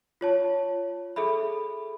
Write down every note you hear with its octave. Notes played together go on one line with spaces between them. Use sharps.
F4 C#5 A5
G#4 A4 E5 B5